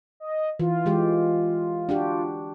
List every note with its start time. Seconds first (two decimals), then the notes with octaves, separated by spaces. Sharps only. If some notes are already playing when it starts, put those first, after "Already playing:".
0.20 D#5
0.60 E3 F4
0.86 E3 G#3 G4
1.89 D4 F#4 G4